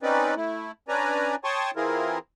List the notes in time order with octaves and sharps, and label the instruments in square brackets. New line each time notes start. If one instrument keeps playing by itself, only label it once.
[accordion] C4 C#4 D#4 B4 D5
A3 E4
C#4 D4 B4 D5 G#5 A#5
C#5 G5 A5 C6 C#6 D#6
E3 C4 E4 F4 G#4 A#4